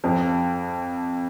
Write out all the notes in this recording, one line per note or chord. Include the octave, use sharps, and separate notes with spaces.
F2 F3